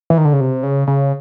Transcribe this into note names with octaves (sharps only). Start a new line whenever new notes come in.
E3
D#3
D3
C#3
C3
C#3
C#3